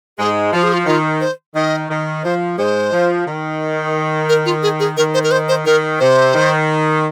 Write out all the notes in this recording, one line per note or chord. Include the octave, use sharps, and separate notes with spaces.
G#2 G#3 G#4
F3 F4
G#4
F4
D#3 F4
C5
D#3 D#5
D#3
F3 C5
G#2 G#3 C5
F3
D#3
A#4
F4
G#4
G#4
D#3 A#4
C5
A#4
C5
C5
D#3 A#4
C3 C5
D#3